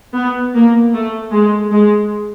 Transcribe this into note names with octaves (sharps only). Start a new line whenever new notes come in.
B3
A#3
A3
G#3
G#3